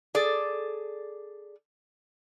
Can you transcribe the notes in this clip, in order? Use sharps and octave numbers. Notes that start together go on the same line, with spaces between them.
G#4 A4 D5